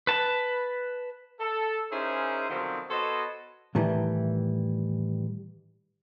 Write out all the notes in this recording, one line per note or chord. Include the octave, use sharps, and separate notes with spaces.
B4 A5
A4
C#4 D#4 E4 G#4 A#4 C5
B2 D3 D#3 F3 F#3 C4
B3 F#4 A4 C5 C#5 D#5
A2 D#3 E3 G3